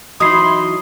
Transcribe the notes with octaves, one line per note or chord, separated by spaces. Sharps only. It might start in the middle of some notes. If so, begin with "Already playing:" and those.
E3 F#3 D#4 B5 C6 D#6 C7